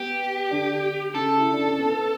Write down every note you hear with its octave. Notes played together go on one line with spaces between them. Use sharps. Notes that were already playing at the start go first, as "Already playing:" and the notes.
Already playing: B3 G4
D3 D4
C#3 C#4 A4
E4
D4
C#4
B3